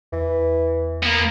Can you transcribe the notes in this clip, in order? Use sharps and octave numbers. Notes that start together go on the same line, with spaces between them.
E2 E3
A#3 B3